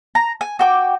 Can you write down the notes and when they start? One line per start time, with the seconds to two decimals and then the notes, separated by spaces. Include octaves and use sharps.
0.15 A#5
0.41 G#5
0.59 F#4 G5 D6